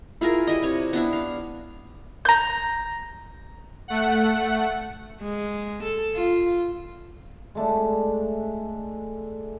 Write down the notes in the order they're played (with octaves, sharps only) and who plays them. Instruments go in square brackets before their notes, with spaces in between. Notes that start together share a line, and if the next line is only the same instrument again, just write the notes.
[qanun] E4 F4 G#4 A#4
G3 E4 D#5
C3 C#5
B3 D4 E4
F5
[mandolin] A#5 G6
[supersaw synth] A3 F#5
[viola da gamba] G#3
A4
F4
[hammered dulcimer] G#3 A3 D4